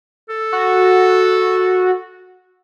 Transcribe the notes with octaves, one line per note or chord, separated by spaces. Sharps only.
A4
F#4